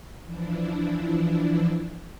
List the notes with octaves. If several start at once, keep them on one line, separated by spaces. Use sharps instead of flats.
E3 F3 D4 E4